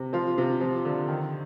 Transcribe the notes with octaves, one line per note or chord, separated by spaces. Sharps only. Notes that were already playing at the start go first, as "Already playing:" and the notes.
Already playing: C3
F3 F4
C3
F3
D3
D#3